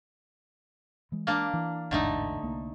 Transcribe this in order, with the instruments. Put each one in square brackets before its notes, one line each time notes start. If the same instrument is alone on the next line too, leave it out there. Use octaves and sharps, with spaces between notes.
[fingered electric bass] E3 G#3
[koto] A#3 D4
[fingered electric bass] E3
[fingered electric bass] A1 E2 G#2 [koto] D3 A3 D#4
[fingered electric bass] C2 A#3